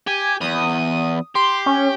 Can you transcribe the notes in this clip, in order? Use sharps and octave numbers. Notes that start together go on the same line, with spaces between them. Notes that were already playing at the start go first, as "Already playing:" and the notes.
G4 G#5
E2 D#6
G4 C6
C#4